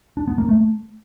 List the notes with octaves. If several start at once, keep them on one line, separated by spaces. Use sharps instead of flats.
D4
B3
A#3
A3